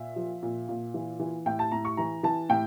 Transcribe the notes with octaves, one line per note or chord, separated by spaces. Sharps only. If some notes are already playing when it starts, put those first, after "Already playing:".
Already playing: A#2 E5
F3
A#2
A#2
E3
E3
A2 G5
A5
A2 A#5
C#6
E3 A#5
E3 A5
A2 G5